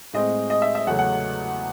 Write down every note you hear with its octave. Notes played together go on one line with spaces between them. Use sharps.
A2 G#3 C4 D#5
D#5
E5
E5
E2 C#3 F#3 A3 F#5
F#5